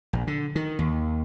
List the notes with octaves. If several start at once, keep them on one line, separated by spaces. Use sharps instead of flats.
A#1
D3
D#3
D#2